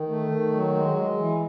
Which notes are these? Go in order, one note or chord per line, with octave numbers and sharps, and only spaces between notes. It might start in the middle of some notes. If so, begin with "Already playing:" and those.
Already playing: D#3
A3
D#3
F#3
G#3
G#3
E3